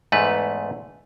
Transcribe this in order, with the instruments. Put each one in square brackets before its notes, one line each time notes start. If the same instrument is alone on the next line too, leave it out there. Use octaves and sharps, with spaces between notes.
[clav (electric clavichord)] E2 G#2 A3 B4